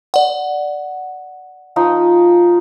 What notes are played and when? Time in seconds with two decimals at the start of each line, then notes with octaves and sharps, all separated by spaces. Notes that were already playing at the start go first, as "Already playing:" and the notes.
0.14 D5 F#5
1.76 F3 D#4 D#6